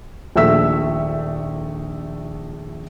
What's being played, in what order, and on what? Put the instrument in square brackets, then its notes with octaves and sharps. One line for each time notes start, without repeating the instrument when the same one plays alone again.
[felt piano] D#1 A#1 A3 E5 E6 B6